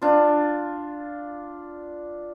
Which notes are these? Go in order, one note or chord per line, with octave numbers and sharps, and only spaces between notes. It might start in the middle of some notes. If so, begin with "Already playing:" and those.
D4 F4